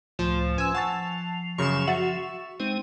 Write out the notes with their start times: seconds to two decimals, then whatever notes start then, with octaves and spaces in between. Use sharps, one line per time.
0.19 C#2 A2 F3 A3
0.58 C#4 B4 G#5 E6
0.75 F3 F#5 A5 C#6 A6
1.58 F#2 C#3 C#6 E7
1.87 F#4 E5 A6
2.60 G#3 C4 D#4